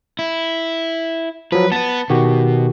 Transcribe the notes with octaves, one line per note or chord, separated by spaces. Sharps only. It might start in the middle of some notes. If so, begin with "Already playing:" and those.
E4
F3 F#3 B4
B3 B4 A5
B2 D#3 F#4 G4